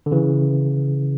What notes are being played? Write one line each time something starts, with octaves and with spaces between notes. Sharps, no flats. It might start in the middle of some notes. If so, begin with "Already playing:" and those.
D3
C#3 E3